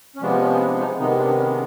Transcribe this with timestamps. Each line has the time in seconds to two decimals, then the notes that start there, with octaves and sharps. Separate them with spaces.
0.16 C#4
0.21 C3 F3 G#3 B3 D4
0.41 C#4
0.60 D4
0.80 D#4
0.99 C3 D#3 G#3 B3 D#4
1.19 D4
1.38 C#4